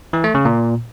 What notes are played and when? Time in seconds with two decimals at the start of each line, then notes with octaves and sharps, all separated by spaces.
0.13 E3
0.24 A3
0.35 C#3
0.45 A#2